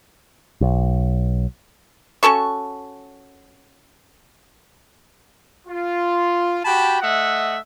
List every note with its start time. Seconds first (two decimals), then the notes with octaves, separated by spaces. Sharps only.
0.61 B1
2.23 C#4 F#4 A4 C#6
5.68 F4
6.65 F#4 G4 G5 A5 B5
7.01 A3 D#5 E5 F#5